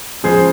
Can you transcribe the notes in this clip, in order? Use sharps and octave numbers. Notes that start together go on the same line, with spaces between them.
C#3 F3 G#3 G#4 C5